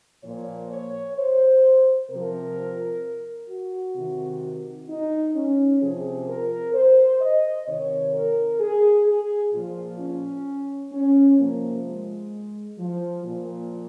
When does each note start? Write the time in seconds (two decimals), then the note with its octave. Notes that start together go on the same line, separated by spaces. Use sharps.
0.24 A#2 F3 C#5
0.71 C#5
1.17 C5
2.10 C3 F3 A#4
3.49 F#4
3.96 C3 D#3
4.89 D#4
5.35 C#4
5.82 C3 F3 G#4
6.29 A#4
6.74 C5
7.21 D#5
7.67 C3 D#3 C#5
8.15 A#4
8.61 G#4
9.07 G#4
9.53 A#2 F3 F4
10.00 C#4
10.92 C#4
11.39 C3 F3 A#3
11.86 G#3
12.78 F3
13.25 A#2 F3